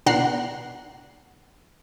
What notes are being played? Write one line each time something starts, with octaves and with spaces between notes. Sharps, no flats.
B2 D4 F#5 A#5 F#6 C7